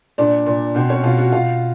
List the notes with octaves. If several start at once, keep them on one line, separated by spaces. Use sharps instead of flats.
A#2 D4 D5
A#2
B2 C4 C5
C#4 C#5
B2 F4 F5
F#4 F#5
B2 F4 F5